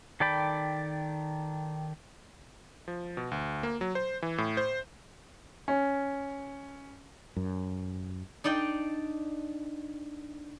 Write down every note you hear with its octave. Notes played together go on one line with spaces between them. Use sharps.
D#3 A4 D5 G5 B5
F3
B2
D2
A#3
F#3
C5
E3
A2
C5
C#4
F#2
D4 D#4 D5 G5